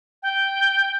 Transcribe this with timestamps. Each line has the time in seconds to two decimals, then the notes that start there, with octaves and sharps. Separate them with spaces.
0.23 G5